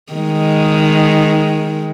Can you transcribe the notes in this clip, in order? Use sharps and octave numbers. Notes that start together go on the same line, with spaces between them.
D#3 G#3